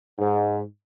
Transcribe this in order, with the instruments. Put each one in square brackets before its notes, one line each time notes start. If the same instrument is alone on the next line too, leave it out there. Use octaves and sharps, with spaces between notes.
[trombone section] G#2